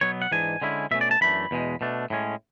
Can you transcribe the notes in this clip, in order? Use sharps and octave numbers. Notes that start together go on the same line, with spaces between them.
B2 F#3 B3 C#5
F#5
G#2 E3 G#3 D4 G#5
D3 G#3 C#4 E4
B2 A3 C#4 E5
D5
A5
F#2 E3 A3 D4 B5
E2 B2 G#3
B2 A3 D4
A2 G#3 C#4